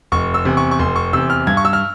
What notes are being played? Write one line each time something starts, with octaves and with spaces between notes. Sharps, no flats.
F1 C#6
E6
E2 C3
C#6
C#6
F1 C6
C#6
E2 C3 E6
F6
G2 G#6
C#6
E6
F6